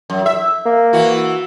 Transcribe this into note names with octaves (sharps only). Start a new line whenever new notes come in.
F#2
E5
A#3
E3 F#4